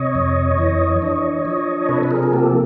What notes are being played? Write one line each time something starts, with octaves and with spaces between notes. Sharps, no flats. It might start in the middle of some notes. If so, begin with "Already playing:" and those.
Already playing: C3 C#5 D#5
F2
E3
D4
F3
C3 A4 B4
B4
G#4 A#4
A#4
A#3 G4 A4